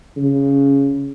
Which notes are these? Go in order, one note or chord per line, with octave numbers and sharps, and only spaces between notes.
C#3